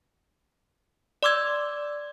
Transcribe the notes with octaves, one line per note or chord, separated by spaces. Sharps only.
D5 C6 D6 E6 G#6